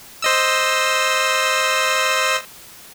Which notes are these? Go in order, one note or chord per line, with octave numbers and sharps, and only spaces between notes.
C5 D#5 E6